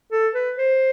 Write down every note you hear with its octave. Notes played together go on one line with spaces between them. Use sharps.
A4
B4
C5